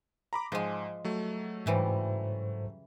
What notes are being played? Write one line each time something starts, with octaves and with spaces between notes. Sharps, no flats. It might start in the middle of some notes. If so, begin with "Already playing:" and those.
A#5 B5 D6
G#2 F3 G#3
F#3 A3
G#2 C#3 E3 G3 C5